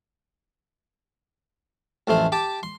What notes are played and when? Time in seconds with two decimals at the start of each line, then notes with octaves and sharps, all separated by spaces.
2.07 A1 F2 A3 C6
2.32 G4 A5 D6
2.63 C6